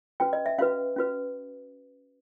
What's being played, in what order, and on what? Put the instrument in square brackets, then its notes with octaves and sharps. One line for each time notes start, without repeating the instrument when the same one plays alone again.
[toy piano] C#4 F#4 B4 G5
D#5
E5
C#4 F#4 B4 F5
C#4 F#4 B4